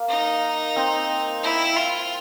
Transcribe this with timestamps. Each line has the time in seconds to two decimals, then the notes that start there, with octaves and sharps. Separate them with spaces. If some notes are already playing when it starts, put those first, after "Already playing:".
Already playing: A#3
0.09 D#4
0.76 C4
1.44 E4
1.76 F4